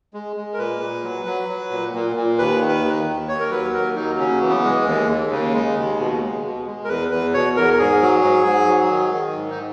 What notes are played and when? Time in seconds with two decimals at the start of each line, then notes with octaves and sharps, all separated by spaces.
0.14 G#3
0.36 G#3
0.54 A#4
0.59 A#2 B4
0.81 A#2
1.04 F#3
1.26 F#3
1.49 F#3
1.71 A#2
1.94 A#2
2.16 A#2
2.39 D#2 B4
2.61 D#3
2.69 B4
2.84 D#2
3.06 D#2
3.28 D#2 C#5
3.40 A#4
3.51 F#3 B4
3.73 D#2 A#4
3.96 F#3 D#4
4.18 C#3 C#4
4.41 E3
4.49 B3
4.64 G#3
4.86 D#2
5.09 D#2
5.31 C#3
5.54 G#3
5.77 D#2
5.99 B2
6.21 G#3
6.44 B2
6.66 G#3
6.84 A#4
6.89 E2 B4
7.11 E2 B4
7.34 B2 C#5
7.56 E2 A#4
7.74 A#4
7.79 G#2 G#4
8.01 F#3
8.24 G#2
8.46 G#2
8.68 F#3
8.91 D#3
9.14 D#3
9.36 G#2
9.50 D#4